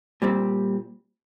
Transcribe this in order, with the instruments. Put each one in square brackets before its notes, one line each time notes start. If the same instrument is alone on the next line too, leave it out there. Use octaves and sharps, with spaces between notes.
[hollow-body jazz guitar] A#2 G3 C4